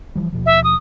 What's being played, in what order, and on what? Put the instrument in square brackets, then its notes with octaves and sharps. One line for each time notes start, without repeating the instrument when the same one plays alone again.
[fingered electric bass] E3 F3 G3
D#2 B2 F3
[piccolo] E5
D#6